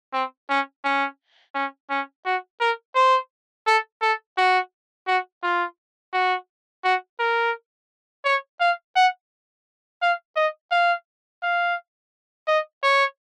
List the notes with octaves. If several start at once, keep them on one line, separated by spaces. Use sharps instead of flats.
C4
C#4
C#4
C#4
C#4
F#4
A#4
C5
A4
A4
F#4
F#4
F4
F#4
F#4
A#4
C#5
F5
F#5
F5
D#5
F5
F5
D#5
C#5